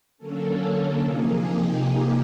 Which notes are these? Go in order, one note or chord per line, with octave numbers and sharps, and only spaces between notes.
D3 F#3 A#3 C#4 A4
C3 F3 A#3 D#4 G#4
G4